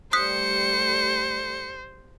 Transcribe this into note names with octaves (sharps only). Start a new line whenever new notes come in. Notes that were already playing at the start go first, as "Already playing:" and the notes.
G3 A3 C5 D#6 F#6 B6 C#7